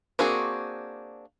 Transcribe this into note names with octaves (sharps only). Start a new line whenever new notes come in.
A#3 C4 D4 F#4 G#4